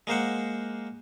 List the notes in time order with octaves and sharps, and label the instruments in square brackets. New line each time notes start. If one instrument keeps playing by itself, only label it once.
[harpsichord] G#3 A#3 C5 F#5